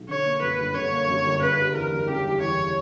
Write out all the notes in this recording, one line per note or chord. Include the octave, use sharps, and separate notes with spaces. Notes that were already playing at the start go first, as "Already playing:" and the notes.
Already playing: B1
D3 C#5
A#3
F#2 B4
G1
D3 C#5
A#3
F#2
G1
C#3 B4
G3
E2 A#4
F#1
C#3 G4
G3
E2 C#5